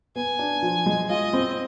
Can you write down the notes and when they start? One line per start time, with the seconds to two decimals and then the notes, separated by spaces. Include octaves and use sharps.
0.16 B3 G#5
0.39 D4
0.62 F3
0.86 G#3
1.10 F4 D#5
1.33 C4